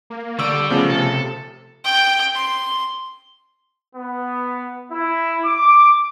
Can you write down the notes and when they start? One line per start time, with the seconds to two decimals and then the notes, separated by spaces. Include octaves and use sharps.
0.10 A#3
0.39 D3 G3 D5 C#6 E6
0.70 C#3 F3 A3 B3
0.90 C3 A4
1.84 G5
2.34 C6
3.96 B3
4.92 E4
5.45 D6